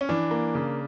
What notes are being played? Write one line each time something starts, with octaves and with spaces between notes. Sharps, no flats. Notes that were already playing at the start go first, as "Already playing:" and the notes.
C#4
E3 D4
A#3
C#3